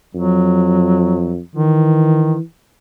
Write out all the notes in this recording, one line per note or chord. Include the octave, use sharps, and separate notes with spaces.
F2 F#3
D#3 E3